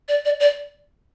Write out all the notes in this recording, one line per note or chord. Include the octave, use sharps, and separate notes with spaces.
D5
D5
D5